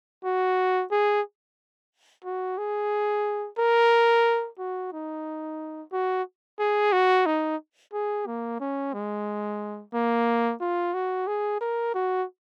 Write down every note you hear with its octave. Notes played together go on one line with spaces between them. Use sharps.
F#4
G#4
F#4
G#4
A#4
F#4
D#4
F#4
G#4
F#4
D#4
G#4
A#3
C#4
G#3
A#3
F4
F#4
G#4
A#4
F#4